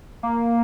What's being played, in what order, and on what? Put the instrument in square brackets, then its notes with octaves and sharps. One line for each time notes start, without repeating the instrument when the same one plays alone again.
[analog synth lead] A#3